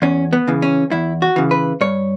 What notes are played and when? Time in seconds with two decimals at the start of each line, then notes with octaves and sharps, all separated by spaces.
0.02 E2 C#4
0.33 B3
0.47 C#3 E3
0.62 C#4
0.91 E2 E4
1.22 F#4
1.36 C#3 E3
1.51 B4
1.81 G2 C#5